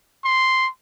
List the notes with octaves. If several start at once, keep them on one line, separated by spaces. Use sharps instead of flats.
C6